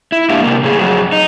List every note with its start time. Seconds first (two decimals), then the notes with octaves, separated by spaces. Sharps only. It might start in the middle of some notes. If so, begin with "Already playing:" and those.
0.12 E4
0.30 G#2 A#3 D4 G4 F5
0.43 C3 A#3
0.64 A2 C#3 G#4
0.79 F2 F#3 F#4 G#4
1.12 D#4